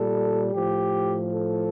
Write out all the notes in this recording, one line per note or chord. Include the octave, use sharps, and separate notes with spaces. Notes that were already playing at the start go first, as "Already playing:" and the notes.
Already playing: A#2 G3 A4
A2 F3 G4
A4